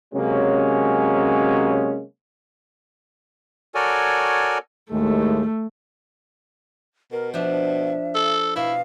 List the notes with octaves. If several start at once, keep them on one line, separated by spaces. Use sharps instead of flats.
C3 F#3 G#3 A#3 C#4
F#4 A4 A#4 C#5 D5 G#5
D#2 A2 G#3 A3
B2 A#4
F3 D4 E5
A4
B2 E4 F5